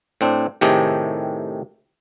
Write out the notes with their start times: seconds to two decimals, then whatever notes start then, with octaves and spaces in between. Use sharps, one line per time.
0.21 A2 C4 D4
0.61 A2 C3 D#3 A3 G4 G#4